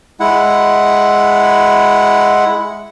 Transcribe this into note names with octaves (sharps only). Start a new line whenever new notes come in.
G#3 E4 F#5